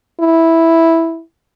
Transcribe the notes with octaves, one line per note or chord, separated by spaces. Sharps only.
E4